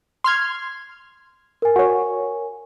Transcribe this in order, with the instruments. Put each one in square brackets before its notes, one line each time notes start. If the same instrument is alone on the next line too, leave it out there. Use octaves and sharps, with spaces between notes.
[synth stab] C6 F6 G#6
[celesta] A#4 G#5
[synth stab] F#4 C#5